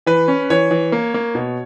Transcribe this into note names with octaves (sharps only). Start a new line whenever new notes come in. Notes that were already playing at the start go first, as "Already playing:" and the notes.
E3 B4
C#4
E3 C#5
E3
A#3
A#3
B2